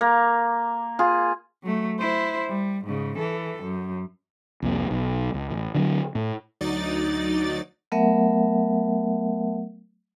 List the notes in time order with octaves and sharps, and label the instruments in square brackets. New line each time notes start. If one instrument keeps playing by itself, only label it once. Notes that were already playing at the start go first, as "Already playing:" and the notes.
[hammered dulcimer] A#3
F4 G#4
[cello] F#3 A3
E4 C5
G3
G#2 C#3
E3 A4
F#2
[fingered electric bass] C2 F2 A#3
B1
C#2
A1
D3 E3 F#3
A2
[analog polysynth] D2 F#3 D#4 D5 A6
[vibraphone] F#3 A3 B3 A#4 E5 F#5